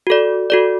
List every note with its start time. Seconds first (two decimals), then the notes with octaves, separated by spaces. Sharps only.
0.07 F#4 A4 D5
0.50 F#4 A4 D5